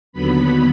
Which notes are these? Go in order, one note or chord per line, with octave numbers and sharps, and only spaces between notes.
D#2 D3 F#3 B3 B5